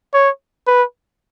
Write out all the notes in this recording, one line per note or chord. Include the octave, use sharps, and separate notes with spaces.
C#5
B4